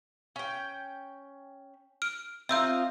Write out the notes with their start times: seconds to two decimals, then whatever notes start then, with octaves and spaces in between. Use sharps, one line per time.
0.36 C#4 G5
2.02 F6 D7
2.49 C4 D#4 F4 E5 E6 G6